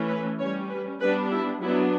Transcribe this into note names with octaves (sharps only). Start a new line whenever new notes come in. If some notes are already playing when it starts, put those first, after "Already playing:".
Already playing: E3 A3 C#4
B4
G3 C#4 C#5
B4
G3 B3 D4 B4
E4
F#3 B3 D4 E4